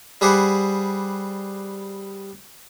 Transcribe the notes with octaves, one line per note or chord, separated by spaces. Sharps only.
G3 G#4 B4 C5 D5 F#5